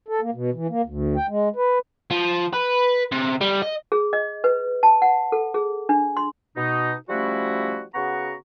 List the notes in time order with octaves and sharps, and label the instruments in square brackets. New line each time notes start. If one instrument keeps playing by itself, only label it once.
[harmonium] A4
A#3
B2
E3
A#3
D2
G5
G#3
B4
[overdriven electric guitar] F3
B4
C3
G3
D#5
[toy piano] G#4
D#5
B4
A5
F#5
A4
G#4
D4
C6
[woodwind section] B2 D#4
F3 G3 A3 C#4 E4 F#4
C#3 B3 F#4 F#5 A#5 C#6